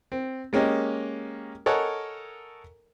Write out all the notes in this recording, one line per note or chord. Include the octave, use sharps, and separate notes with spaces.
C4
G#3 A#3 C#4 G4 D#5
A4 A#4 C#5 D#5 F#5 G#5